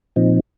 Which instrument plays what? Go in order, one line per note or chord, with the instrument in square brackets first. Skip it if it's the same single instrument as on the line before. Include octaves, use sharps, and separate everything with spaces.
[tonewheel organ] A#2 F3 C4 D#4